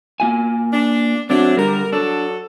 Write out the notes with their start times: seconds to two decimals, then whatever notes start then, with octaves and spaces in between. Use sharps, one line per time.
0.20 A#3 F4 G#5
0.74 D4
1.30 F#3 A3 C4 D4
1.57 D3 G3 A#4
1.93 F#3 D4 F#4 A4